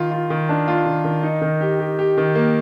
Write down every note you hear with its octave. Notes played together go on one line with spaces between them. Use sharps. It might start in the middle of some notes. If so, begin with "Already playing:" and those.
Already playing: D#3 F4
F4
D#3
D4
F4
D#3
D#3
D#4
D#3
G4
G4
G4
D#3
A#3